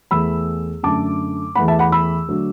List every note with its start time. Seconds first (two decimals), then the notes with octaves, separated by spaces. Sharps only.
0.11 E2 E3 A3 B5 E6
0.83 F#2 D3 A3 A5 D6
1.55 E2 E3 A3 F#5 B5
1.68 E5 A5
1.79 F#5 B5
1.92 B5 E6
2.28 D3 F#3 A3